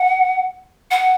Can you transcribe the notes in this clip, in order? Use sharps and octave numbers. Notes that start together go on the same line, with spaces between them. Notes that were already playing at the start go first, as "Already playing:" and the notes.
Already playing: F#5
F#5